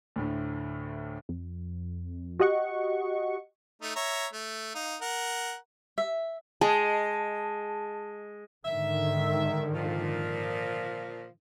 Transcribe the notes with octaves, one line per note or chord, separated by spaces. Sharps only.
D2 A2 D3
F2
F#4 G4 D#5 F#5 C#6
A3 D#4
C#5 E5 A#5
A3
D#4 F5
A#4 F#5
E5
G#3 G#4 A5
G#2 D3 D#3 E5
A#2 F3